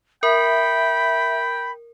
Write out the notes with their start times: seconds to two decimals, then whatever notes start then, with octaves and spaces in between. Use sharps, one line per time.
0.23 A#4 E5 G5 B5